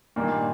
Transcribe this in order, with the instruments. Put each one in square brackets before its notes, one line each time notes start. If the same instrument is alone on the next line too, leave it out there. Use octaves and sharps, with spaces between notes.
[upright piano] G2 D#3 A#3 D4 [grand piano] A#2